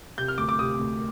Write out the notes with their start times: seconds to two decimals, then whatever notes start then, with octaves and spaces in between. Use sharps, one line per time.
0.18 C3 G6
0.28 F6
0.38 D2 D6
0.49 D6
0.59 C3 D#6
0.79 D2